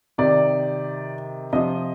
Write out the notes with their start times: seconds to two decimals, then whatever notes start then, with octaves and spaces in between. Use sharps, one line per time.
0.18 C3 D#3 D5
1.53 C3 F3 D#5